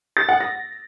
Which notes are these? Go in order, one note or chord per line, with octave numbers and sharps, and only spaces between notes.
A6
F#5
A#6